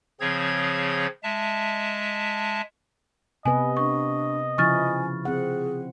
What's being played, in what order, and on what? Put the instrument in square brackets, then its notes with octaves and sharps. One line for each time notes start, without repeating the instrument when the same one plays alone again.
[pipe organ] C#3 F3 C4 G#4 C#5 G#6
G#3 E5 A5
[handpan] C3 B3 B4 [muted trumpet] D#5 [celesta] G#5
[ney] D4 [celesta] C#6
[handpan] C#3 F3 E4 [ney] G#5 [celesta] C#6 F6 A6
[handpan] C4 F#5 [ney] G#4